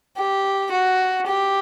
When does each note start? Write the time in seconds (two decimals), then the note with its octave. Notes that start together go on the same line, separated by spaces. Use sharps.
0.17 G4
0.71 F#4
1.27 G4